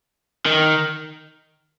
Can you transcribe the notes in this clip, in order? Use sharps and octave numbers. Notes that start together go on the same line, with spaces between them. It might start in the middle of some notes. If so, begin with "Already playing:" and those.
D#3